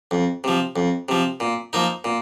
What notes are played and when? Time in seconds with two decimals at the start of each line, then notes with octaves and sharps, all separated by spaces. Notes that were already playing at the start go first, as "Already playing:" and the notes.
0.11 F2
0.44 C3 F3
0.76 F2
1.09 C3 F3
1.40 A#2
1.73 F3 A#3 D#4
2.04 A#2